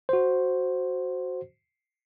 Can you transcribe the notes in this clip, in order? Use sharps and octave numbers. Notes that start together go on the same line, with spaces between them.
F#4 C5